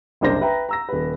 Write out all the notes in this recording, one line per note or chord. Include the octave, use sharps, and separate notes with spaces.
F#1 C2 D4 C5 A#6
B4 E5 G5 A#5
A#5 E6 A#6
D#1 B4